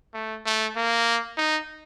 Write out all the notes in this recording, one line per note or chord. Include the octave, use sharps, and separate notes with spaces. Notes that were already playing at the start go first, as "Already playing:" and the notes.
A3
A3
A#3
D#4